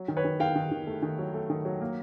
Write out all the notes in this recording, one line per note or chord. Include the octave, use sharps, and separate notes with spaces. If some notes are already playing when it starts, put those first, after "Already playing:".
Already playing: F#3
D#3
B4 C#5
D#3
D#3 F5 G5
D#3
D#3
A3
D#3
F#3
A3
D#3
F#3
A#3